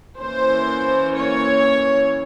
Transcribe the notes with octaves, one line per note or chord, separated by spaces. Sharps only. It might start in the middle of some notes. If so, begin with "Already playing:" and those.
E3 A#3 C#4 C5
C#5